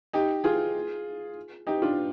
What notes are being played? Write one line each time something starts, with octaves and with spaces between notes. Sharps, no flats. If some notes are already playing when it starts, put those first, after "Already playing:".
D#4 G4
F4 G#4
D#4 G4
D4 F4